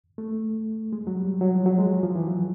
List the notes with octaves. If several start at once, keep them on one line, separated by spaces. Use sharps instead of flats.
A3
G#3
F#3
G3
F#3
F3
F#3
G#3
F3
E3
F#3